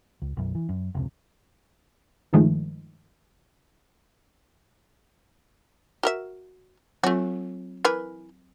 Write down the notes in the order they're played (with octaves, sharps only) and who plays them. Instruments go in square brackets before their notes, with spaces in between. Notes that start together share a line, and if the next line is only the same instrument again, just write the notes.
[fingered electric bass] C#2
B1 F#2
E3
F#2
F1 C#2 C3
[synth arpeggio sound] G2 D#3 F3 G#3 A3
[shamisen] F#4 A#4 E5
[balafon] F#3 C4 F4 [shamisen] A3 F#4
[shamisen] E3 A#4 B4